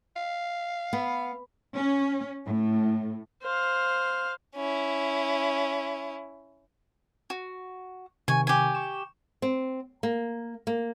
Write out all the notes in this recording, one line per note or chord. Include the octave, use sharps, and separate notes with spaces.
F5
B3
C#4
A2
C5 F5
C#4 E4
F#4
C3 D#3 G#5 C#6
G4 G#5
C#6 E7
C4
A#3
A#3